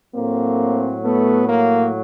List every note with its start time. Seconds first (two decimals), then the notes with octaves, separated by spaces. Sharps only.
0.15 A2 F#3 A3 A#3 C4
1.04 A3 B3
1.48 A#3